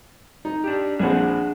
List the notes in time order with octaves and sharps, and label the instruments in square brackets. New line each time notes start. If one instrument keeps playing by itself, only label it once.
[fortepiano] D#4
[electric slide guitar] D4 G4
[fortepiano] A#1 C4 [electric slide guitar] D4 G#4 F#5